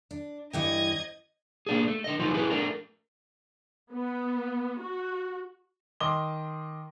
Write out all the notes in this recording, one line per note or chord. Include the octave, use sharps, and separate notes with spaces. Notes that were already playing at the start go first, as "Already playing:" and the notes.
D4
G2 E3 D#5 G5 G#6
A#3 D4 G#4
A3
D3 D#5
F3 F#3 A3 D#4 F4
C#4 E4 G#4 B4
A3 D4 A#4
B3
F#4
D#3 D#5 C6 D6 G7